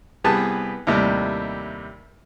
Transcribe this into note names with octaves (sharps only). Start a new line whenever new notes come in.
C2 B3 G4 G#4 B4 A5
D#2 A2 C3 G3